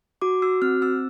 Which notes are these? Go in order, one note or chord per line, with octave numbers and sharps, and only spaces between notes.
F#4 D6
F#4 E6
C4 F6
C4 E6